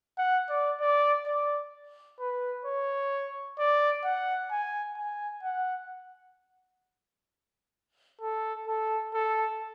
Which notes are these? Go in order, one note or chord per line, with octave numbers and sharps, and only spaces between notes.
F#5
D5
D5
D5
B4
C#5
D5
F#5
G#5
G#5
F#5
A4
A4
A4